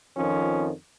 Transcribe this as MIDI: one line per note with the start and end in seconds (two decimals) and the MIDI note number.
0.16 0.71 41
0.16 0.71 51
0.16 0.71 53
0.16 0.71 60
0.16 0.71 61